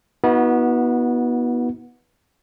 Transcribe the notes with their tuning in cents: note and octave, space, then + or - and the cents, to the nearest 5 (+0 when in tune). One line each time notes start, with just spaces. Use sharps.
B3 -20 D#4 +45 F#4 +0